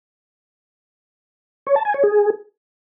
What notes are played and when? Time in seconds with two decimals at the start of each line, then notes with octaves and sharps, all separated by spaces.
1.67 C#5
1.76 A5
1.85 G#5
1.94 C#5
2.03 G#4